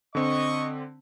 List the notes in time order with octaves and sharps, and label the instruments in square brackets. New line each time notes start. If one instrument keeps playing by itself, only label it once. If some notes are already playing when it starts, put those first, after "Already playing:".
[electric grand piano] D3 C4 [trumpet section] D#5 C#6